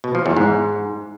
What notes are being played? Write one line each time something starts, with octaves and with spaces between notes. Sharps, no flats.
B2
F3
E2
G#2